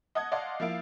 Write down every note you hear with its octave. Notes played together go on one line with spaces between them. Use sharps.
D#5 F#5 A5 D#6 G#6
D5 D#5 F5 F#5 A5 C6
F3 A#3 E4 F5 D7